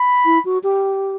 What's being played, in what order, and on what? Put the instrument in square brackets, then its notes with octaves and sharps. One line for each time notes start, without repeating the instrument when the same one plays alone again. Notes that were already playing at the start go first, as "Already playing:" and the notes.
Already playing: [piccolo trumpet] B5
[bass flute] E4
F#4
G4